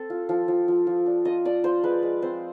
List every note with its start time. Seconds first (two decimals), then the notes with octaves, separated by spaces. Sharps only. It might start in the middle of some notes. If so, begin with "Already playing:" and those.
Already playing: C4 A4
0.10 F4
0.29 F3
0.48 F3
0.68 F3
0.87 F3
1.06 D4
1.25 F4 D#5
1.45 D4 D5
1.64 F4 C5
1.83 G#3 B4
2.03 G#3
2.22 C4 C5